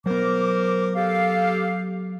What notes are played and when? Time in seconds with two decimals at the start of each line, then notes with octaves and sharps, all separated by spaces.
0.06 F#3 B3 A#4 C5 D6
0.95 G4 A4 F5